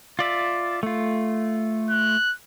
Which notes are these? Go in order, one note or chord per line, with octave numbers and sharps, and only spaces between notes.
F4 D5 E5
A3 F4
F#6